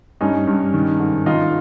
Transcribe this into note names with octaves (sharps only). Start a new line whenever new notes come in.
G2 C#4 D#4
G2
D#3
G#2
D#3 D#4 F4